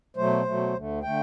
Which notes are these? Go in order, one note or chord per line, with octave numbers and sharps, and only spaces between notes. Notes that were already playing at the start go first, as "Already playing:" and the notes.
B2 F#3 A3 C5
B2 F#3 A3
D2 D3 A3
D3 A3 G5